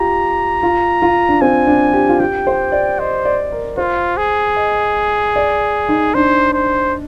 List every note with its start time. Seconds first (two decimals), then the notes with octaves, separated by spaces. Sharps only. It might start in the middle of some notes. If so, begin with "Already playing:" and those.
Already playing: F4 G4 A#5
0.63 F4
1.02 F4
1.29 D4
1.41 C4 G#5
1.67 D4
1.93 G4
2.09 F4
2.20 G4 G5
2.47 C5
2.72 D5
2.99 C5 D#5
3.25 D5
3.52 A#4
3.78 F4 C5
4.17 G#4
4.56 D#5
5.36 D5
5.89 D#4
6.14 D4 C5
6.54 C5